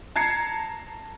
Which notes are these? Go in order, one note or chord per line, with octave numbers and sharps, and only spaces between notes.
A5 A#5 G#6 C7 C#7